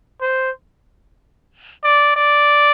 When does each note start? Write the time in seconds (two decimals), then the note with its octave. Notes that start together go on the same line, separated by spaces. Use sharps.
0.21 C5
1.84 D5
2.16 D5